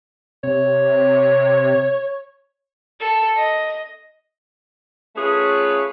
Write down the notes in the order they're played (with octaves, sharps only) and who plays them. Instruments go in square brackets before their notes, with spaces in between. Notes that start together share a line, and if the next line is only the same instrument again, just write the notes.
[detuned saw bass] C3 [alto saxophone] C#5
[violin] A4
D#5
[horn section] A3 C#4 F4 G#4 B4 C#5